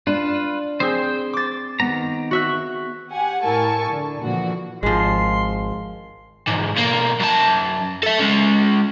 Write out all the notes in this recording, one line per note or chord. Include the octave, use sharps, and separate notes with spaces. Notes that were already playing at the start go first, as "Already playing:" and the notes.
D4 F4 B4 E7
C4 G#4 C5 G5
D6 A6
D#3 B3 A#5
F#4 E5 F#6
G4 F#5 G#5
A2 E4 A#4 G#5 A5 C#6
D3
A#2 D3 E3 F3 F#4
G#1 F3 G#3 C6
E2 G#2
B1 A#3
F#2 A5
A4 E5
G#3 C#4